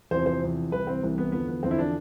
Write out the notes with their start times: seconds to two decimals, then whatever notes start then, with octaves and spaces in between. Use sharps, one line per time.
0.11 E2 C3 F3 C5
0.26 C5
0.42 E2 C3 F3
0.72 C2 C3 E3 B4
0.87 C4
1.02 C2 C3 E3
1.18 B3
1.32 E2 D3 F3 B3
1.48 B3
1.63 E2 D3 F3 C4
1.71 E4
1.78 D4